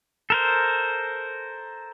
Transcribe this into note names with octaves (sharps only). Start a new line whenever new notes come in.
A4 A#4 C5